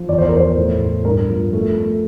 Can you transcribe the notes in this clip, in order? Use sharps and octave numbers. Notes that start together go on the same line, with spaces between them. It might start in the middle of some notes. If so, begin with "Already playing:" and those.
Already playing: F3
E2 D5
C5
A#4
E2 C5
A2
A2
G2 A#4
F3
A3
A3